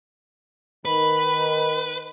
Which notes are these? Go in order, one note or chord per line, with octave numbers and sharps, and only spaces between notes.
D#3 B4 B5